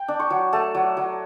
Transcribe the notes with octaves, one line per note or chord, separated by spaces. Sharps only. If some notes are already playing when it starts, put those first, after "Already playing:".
Already playing: G5
D4
C#6
F#3
A3 A5
F#3
F#3